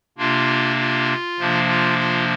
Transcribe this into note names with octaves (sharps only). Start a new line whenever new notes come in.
C3 A#3 D4 F4
F4
C3 F3 A#3 D4
F4
F4